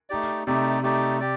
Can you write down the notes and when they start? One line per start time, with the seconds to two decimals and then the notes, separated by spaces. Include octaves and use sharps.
0.10 A3 D#4 G4 D5
0.47 C3 A3 D#4 G4 D5
0.83 A3 D#4 G4 D5
1.20 G4 D5